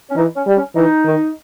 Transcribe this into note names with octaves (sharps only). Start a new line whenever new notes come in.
C#4
E3 D#4
C#4
G3
C#4
E3 D#4
D#3